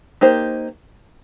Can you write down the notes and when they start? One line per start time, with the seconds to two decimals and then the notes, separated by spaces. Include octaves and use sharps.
0.21 A#3 D#4 G4 C5